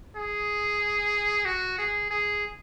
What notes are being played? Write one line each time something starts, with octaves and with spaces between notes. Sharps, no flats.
G#4
F#4
G#4
G#4